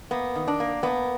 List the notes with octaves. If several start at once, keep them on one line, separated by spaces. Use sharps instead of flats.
A#3 B3
D#3
D4
A#3
A#3 B3